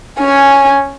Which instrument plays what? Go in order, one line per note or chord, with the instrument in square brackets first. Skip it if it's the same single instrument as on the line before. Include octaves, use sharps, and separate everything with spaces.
[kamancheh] C#4 G#5